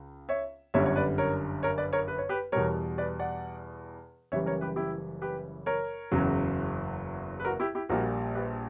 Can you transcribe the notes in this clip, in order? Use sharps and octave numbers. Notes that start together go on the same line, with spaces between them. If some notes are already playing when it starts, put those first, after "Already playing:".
Already playing: C#2
C#5 E5
G1 F#2 D3 G3 C#5 E5
C#5
B4 D5
A#4 C#5
A#4 C#5
B4 D5
A#4 C#5
B4
C#5
G4 B4
E2 B2 G3 A#4 C#5
B4 D5
D5 F#5
F#1 F#2 E3 G3 C#5 E5
A#4 C#5
G4 B4
E4 G4
G4 B4
A#4 C#5
F#1 E2 C#3 F#3
B4
F#4 A#4
E4 G4
E4 G4
A#1 A#2 G3 F#4 A#4
G4 B4